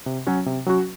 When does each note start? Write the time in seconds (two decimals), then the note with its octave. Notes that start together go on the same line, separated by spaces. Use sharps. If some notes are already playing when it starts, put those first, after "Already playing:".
0.06 C3
0.27 F#3 C#4 F#4
0.46 C3
0.66 F#3 C#4 F#4